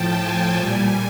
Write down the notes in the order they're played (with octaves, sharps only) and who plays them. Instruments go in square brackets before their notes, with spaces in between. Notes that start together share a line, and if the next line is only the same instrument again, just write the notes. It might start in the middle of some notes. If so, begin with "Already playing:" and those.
Already playing: [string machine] A2 F3 G5 A5
G#5
A#2 G3